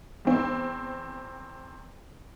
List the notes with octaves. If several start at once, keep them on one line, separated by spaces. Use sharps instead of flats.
E2 C4